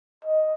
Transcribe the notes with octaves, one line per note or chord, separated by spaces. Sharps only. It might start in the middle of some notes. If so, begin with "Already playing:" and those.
D#5